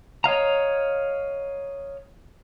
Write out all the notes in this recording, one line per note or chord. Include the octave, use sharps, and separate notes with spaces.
C#5 D#5 F5 A#5